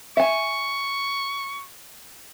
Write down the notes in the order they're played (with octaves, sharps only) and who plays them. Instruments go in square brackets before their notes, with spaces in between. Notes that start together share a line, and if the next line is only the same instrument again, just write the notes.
[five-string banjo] E5 G#5 [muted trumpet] C#6